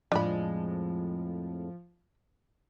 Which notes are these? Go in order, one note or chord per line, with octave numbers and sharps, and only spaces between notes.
F2 A2 F3 G#3 D4 B5